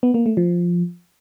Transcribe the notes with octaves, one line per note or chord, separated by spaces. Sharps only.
B3
A#3
A3
F3